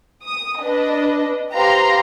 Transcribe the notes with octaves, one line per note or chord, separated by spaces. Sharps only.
D#6
D4 B4 D#5
G4 B4 C5 F5 A#5 C6